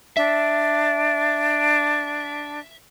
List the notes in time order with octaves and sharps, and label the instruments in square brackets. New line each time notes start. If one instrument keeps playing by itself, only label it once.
[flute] D4 [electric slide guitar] E5